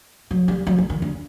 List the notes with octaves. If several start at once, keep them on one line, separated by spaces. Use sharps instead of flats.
F#3
G3
F#3
F3
D#3
D3